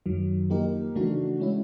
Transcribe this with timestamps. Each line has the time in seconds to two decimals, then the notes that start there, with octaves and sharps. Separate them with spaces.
0.06 F#2 D#3 F#3
0.50 F3 A#3 D#4 G4 A#4
0.95 C#3 E3 A3 D4 F#4
1.40 G#3 C#4 E4